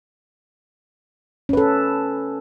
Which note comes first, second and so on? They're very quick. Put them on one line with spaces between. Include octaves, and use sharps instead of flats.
C#4 B4 A4